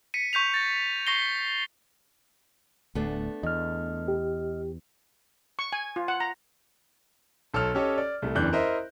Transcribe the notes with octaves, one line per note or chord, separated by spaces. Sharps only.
B6 C#7 D#7
C#6 G6 B6 F7
A6 A#6
C#6 A#6 C7 G7
D1 D2 A3 B3 D4
E2 D#5 F6
G4
C#6
G#5
F4
F#5
A#5
B1 A4 C#5 E6 F6
C#4 G4 A4 C#5 D#5
D5
C2 A3
F#1 E2 E3 D4 F#6 G6
E4 A#4 C5 D#5 E5